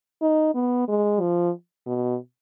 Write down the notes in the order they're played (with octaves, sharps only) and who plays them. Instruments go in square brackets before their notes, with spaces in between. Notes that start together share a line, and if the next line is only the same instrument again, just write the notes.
[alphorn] D#4
B3
G#3
F3
B2